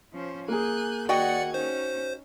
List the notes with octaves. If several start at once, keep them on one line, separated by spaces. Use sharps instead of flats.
F3 C#4 C5
A#3 G#4 G#5 F#6 G6
D#2 F#4 D5 D#5 F#5 G5 G#6 C#7
C#4 D#4 C5